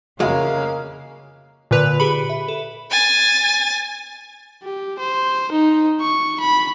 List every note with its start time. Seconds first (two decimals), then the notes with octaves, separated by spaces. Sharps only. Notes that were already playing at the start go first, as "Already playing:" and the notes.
0.20 F2 C#3 G#3 A#3 E4 F#4 F5
1.71 A#2 D3 B4 F7
2.00 G4 G#4 B5 C#7
2.30 E5
2.48 A4
2.91 G#5 A6
4.63 G4
4.99 C5
5.52 D#4
6.01 C#6
6.40 B5